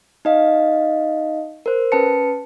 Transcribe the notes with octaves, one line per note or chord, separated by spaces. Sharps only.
D#4 D#5 F5
A#4 C5
C#4 B4 A5 C#7